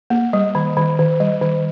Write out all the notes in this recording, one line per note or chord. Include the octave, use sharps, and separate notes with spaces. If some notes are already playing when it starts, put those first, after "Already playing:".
A#3
G3
D#3
D#3
D#3
G3
D#3